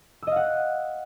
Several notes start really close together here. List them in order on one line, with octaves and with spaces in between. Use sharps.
E6 D#5 F5 F#5